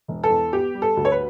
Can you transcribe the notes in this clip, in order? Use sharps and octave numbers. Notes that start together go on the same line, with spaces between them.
E1
A4
E2
B3 G4
G3
A4
D2
C#5
B4